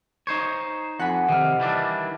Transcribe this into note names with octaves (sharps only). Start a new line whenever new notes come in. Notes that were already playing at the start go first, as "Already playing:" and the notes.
D#4 C5 C#5
F2 F#5 G#5 B5
C3 D#3 F6
E3 G3 D4